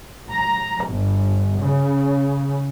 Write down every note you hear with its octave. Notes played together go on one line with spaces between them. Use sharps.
A#5
G1
C#3